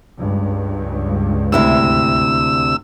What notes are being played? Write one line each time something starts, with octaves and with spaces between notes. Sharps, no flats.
C#2 G2
D2 C3 E4 E6